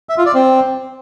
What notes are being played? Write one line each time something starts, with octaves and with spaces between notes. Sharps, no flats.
E5
F4
D5
C4